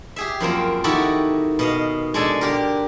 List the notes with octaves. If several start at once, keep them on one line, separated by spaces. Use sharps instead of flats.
G4 G#4 E5
F#2 F3 A#3 C4
D#3 D#4 E4 F#4 G4 A4
B2 D#5 F5
G#3 D4 A4 G#5
D3 G4 A#4